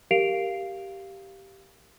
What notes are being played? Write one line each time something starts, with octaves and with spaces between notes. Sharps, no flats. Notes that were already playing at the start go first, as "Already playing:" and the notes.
G4 A#4 F5 C7 D7 F7